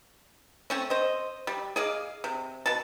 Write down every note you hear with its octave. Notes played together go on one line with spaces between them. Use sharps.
A3 C4 C#4
C5 D#5
G3
G#4 D5 D#5 F5
C3
B2 A5